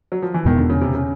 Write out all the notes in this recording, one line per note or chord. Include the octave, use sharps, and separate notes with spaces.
F#3
F3
E3
E2 B2 D#3 G#3 B3
D3
C#3
C3
C#3